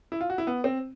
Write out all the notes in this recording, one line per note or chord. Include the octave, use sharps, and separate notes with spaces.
E4
F4
F#4
E4
B3
C4